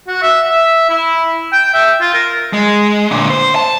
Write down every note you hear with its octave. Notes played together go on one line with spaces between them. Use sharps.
F#4
E5
E5
E4
G5
E5
F4
A#4
G#3
A#2 D3
C5
A5